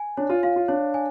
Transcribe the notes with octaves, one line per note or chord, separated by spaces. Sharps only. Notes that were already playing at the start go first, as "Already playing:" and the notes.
Already playing: G#5
D4 C#5
F4
F4 F5
F4
D4 C#5
G#5